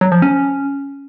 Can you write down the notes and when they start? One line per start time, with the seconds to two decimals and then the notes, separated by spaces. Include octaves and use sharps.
0.01 F#3
0.12 F3
0.22 C#4